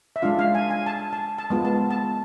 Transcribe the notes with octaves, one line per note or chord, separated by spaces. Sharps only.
E5
G#3 D4 F4 F5
F5
G#5
G#5
A5
A5
A5
G#3 B3 F4
A5
A5